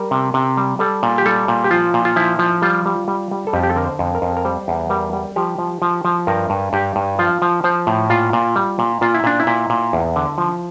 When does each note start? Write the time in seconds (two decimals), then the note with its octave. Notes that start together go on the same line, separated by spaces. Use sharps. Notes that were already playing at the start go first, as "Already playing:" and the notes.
Already playing: G3 A#4
0.11 C3
0.34 C3
0.57 G3
0.79 G3 A4
1.03 A#2
1.18 G4
1.26 G3 A4
1.48 A#2
1.64 G4
1.71 F3 F4
1.94 A#2
2.05 F4
2.16 F3 E4
2.39 F3
2.62 G3 F4
2.86 G3
3.08 G3
3.31 G3
3.47 A4
3.53 F2 G4
3.63 G4
3.70 A4
3.76 D3 A#4
3.84 C5
3.99 F2
4.15 A#4
4.22 F2
4.37 A#4
4.45 G3 C5
4.68 E2
4.90 G3 A#4
5.13 G3
5.36 F3 G4
5.59 F3
5.82 F3
6.05 F3
6.27 G2 A#4
6.50 G2
6.73 G2 G4
6.96 G2
7.19 F3 F4
7.42 F3
7.64 F3 C5
7.87 A2
8.10 A#2 F4
8.33 A#2
8.56 G3
8.79 A#2
9.01 A#2 F4
9.14 E4
9.24 A#2 D4
9.40 E4
9.47 A#2
9.70 A#2
9.93 E2
10.16 D3
10.38 F3